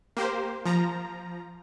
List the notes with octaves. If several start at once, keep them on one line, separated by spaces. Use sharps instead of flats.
A#3 G4 C5
F3 A#5